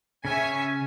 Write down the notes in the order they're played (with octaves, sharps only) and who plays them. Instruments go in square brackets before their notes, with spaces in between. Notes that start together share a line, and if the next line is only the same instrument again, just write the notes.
[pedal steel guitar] C#3 C#4 [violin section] C#5 E5 G#5